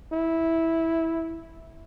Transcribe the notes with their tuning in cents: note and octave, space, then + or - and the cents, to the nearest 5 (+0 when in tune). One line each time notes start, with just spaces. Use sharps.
E4 -10